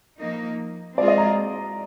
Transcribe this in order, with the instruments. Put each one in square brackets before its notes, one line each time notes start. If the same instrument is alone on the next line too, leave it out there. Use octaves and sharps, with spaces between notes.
[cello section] F3 A#3 D#4
[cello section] G#3 C4 F4 G#4 [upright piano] D5
[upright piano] D#5
A#5